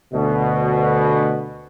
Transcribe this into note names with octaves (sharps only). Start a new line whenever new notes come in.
D2 B2